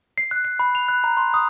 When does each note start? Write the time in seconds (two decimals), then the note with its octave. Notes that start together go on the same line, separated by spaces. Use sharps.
0.18 C7
0.31 F#6
0.45 C7
0.59 B5
0.75 F7
0.88 F#6
1.04 A#5
1.17 C6
1.34 D#6